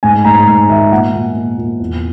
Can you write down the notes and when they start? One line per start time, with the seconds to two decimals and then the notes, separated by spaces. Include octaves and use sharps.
0.03 G#2 G#5
0.25 G#2 A#5
0.47 G#2
0.69 D#3 E5
0.91 A#2 F#5
1.14 A#2
1.36 A#2
1.58 A#2
1.79 E2